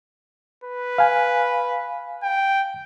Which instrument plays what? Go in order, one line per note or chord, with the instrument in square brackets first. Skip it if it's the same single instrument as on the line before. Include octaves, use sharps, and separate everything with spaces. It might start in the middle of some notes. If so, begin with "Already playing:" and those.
[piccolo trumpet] B4
[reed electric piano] F5 G#5
[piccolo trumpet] G5